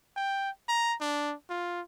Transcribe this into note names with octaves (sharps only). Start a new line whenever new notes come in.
G5
A#5
D4
F4